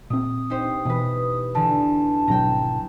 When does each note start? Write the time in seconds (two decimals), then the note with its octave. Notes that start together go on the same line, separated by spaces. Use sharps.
0.10 A#2 C4 D#6
0.50 D#4 G4 C5
0.85 B2 E3 B4
1.55 E2 D3 A5
2.28 G#1 B2 F#3 G5 A#5